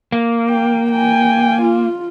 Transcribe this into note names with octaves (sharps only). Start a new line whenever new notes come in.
A#3
G5
G5 G#5
F4